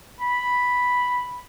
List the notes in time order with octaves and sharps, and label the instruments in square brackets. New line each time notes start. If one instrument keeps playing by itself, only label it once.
[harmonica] B5